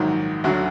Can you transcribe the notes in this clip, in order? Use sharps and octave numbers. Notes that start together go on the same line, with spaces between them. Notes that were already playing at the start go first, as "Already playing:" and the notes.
Already playing: A#1 G#2 D#3 F#3
D2 D3 F#3 F#4